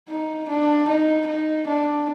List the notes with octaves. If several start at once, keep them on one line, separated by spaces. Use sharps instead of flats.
D#4
D4
D#4
D#4
D4